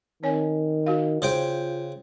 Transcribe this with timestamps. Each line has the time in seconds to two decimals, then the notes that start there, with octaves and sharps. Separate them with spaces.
0.23 D#3 C4 C#5 G#5
0.86 F#4 F5
1.22 C#3 F4 C5 G5